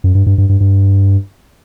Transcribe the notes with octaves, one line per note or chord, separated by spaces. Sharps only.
F#2
G2
G2
G2
G2
G2